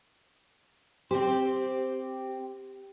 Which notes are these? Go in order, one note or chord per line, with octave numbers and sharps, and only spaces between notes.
C4 G4 C5